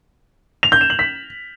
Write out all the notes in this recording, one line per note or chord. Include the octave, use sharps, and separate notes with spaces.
F7
G6
E7
F#7
B6